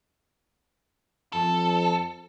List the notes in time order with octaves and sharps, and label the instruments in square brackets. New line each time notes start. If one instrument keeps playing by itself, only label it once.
[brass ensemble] F2 [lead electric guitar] A4